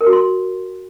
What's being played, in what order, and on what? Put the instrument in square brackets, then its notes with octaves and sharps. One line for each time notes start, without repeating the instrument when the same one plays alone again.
[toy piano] A#4
F#4
C6